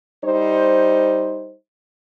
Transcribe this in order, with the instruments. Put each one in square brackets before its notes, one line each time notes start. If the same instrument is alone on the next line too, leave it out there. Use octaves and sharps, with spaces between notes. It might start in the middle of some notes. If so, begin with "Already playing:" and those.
[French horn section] G3 D#4 C5